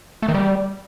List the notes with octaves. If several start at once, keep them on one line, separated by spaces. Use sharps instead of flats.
A3
D#3
G3